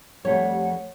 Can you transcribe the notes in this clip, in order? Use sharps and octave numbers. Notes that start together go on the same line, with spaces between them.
F2 G3 A3 C#5 F#5